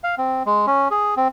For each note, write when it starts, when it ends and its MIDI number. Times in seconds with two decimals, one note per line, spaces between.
0.04 0.15 77
0.18 0.43 60
0.46 0.66 56
0.67 0.88 61
0.91 1.14 68
1.17 1.28 60